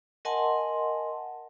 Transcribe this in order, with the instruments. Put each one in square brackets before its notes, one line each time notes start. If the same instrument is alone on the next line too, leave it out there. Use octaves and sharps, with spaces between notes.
[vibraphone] A#4 D#5 F#5 G#5 A5 C6